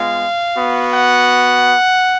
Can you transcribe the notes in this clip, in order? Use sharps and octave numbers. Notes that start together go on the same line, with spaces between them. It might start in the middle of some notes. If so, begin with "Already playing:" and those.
Already playing: G#3 B3 F4 F5
B3 F#4
F#5